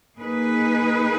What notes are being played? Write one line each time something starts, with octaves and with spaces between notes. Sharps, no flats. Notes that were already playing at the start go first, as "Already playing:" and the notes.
A#3 D#4 G#4 B4